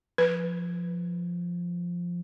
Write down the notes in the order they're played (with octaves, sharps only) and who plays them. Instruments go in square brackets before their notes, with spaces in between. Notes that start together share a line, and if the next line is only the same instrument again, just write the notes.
[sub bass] F3 [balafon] B4